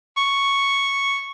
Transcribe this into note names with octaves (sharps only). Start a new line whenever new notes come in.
C#6